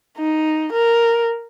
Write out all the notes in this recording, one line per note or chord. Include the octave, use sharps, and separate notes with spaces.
D#4
A#4